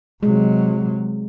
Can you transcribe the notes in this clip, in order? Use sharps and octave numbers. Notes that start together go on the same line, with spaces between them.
C3 F#3 G#3